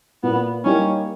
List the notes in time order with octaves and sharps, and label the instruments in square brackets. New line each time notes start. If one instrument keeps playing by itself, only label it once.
[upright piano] A#2 [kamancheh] B3
[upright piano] G3 A#3 D#4 G4 [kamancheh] C#4